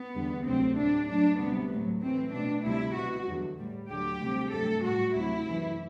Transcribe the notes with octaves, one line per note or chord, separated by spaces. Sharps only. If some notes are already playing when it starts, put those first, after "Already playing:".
Already playing: B3
E2 D3 G3
D2 C3 F#3 A3 C4
A2 G3 D4
G2 F#3 A3 D4
D2 C3 G3 B3
A2 F#3 A3
A2 E3 A3 C4
B2 A3 D4
D2 C3 G3 E4
B2 G3 F#4
E2 D3 F#3
A2 G3
D2 D3 F#3 G4
D2 C3 G3
G2 F#3 A3 A4
A2 G3 F#4
D2 C3 F#3 E4
F#2 E3 A3